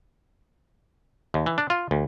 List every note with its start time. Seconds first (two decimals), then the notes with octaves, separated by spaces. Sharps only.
1.34 D#2
1.46 E3
1.58 D4
1.70 F4
1.91 D2